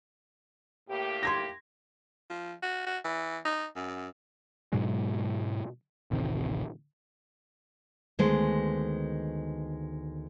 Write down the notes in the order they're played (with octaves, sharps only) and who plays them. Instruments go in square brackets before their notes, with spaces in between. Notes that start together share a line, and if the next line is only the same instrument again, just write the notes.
[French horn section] A2 A#3 G4
[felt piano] C6 G#6 A#6
[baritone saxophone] F3
F#4
F#4
E3
D#4
F#2
[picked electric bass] G#2 B2 F#3 G#3
D1 A1 C3 D#3
[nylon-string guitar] D2 D#3 G#3 B3 C5 G#5